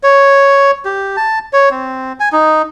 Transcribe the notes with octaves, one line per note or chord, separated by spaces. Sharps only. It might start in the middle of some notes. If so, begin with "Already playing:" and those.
C#5
G4
A5
C#5
C4
G#5
D#4